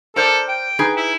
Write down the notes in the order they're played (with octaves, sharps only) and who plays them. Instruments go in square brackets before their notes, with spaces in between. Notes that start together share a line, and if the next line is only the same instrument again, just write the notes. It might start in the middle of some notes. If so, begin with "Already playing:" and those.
[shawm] A4 [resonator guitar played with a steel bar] A#4 C5 D5
[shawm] G5
[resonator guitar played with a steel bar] D#4 G#4 B4
[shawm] E4